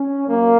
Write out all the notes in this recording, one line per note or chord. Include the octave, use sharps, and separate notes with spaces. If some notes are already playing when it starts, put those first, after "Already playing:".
Already playing: C#4
F#2 A#3